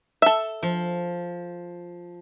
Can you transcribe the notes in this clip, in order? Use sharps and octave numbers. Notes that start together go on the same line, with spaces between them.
A4 E5
F3